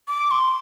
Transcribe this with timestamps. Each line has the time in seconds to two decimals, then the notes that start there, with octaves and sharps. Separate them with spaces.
0.08 D6
0.31 C6